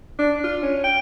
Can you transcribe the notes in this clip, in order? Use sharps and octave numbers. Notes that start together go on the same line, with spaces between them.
D4
F4
C#4
G5